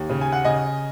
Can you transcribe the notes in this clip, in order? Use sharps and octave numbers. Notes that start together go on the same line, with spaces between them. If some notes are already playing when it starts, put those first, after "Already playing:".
Already playing: D#2
C#3
G#5
F#5
C#3 D#5 G#5